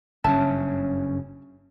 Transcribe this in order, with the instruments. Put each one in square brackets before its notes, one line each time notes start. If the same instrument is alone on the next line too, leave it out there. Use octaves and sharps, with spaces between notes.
[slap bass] F#1 G2 C#3 [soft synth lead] C#4 [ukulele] E5 A5